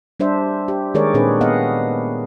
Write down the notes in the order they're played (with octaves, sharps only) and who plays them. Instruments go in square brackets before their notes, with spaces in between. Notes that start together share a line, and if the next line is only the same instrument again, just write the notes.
[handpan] G3 D4 C5 E5
G4
D#3 G#3 G#4 A#4 C#5 D5
A#2 C4 D4 G#4 B4
B3 D#5 F5 F#5